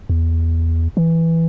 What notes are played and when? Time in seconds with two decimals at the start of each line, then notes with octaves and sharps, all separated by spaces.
0.09 E2
0.97 E3